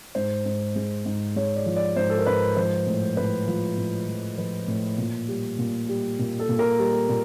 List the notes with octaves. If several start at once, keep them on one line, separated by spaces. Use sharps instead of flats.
G#2 C5
G#2
G#3
G#2
G#3 C#5
D5
F3
D5
G#2 C5
A4
A#4
G#2 B4
F3 C5
A2
A2 B4
F3
A2
F3
F3 B4
A2
A#2
G3
A#2
G3
A#2
A4
A#2
A#4
G3
A#2